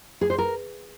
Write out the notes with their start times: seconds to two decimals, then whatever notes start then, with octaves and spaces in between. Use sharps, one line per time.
0.21 G#4
0.30 C5
0.38 A#4